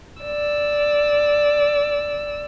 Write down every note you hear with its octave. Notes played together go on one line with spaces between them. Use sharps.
D5 E6